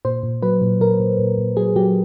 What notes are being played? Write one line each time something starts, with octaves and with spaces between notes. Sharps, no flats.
A#2 C5
A#2
F#3 B4
A#2
A#2 A#4
A#2
A#2
A#2
F#3 G#4
F#3 G4